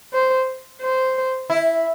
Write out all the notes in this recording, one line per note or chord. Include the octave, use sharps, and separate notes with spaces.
C5
C5
E4